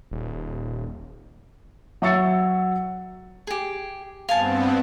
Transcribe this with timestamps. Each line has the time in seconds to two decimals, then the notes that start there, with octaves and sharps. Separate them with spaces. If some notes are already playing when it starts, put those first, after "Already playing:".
0.11 D#1
2.02 F#3 E5 C#6 E6 A6 C#7
3.47 G4 G#4
4.29 G2 B3 C4 F5 G#5 A5